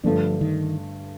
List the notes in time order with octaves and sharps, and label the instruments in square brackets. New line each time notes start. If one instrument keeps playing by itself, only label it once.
[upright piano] G2 D3 A3 D4 [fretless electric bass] F3
[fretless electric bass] D#3